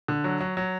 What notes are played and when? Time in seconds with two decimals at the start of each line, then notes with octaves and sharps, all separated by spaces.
0.08 D3
0.24 F#3
0.40 F#3
0.57 F#3